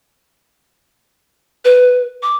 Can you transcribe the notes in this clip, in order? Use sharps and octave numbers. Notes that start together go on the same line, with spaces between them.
B4
D6